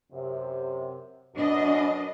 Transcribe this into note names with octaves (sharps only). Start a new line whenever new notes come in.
F#2 C3
F#2 B2 D4 D#5